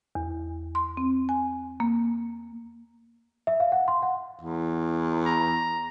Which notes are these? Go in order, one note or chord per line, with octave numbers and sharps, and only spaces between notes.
E2
C6
C4
G#5
A#3
E5
F5
F#5
C6
F#5
E2
A#5